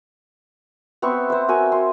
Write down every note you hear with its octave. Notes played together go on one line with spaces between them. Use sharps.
B3 C4 E5 C#6
C5 E5
F#4 A#4 G#5
C6